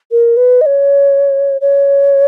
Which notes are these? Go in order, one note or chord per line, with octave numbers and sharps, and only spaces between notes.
A#4
B4
D#5
C#5
C#5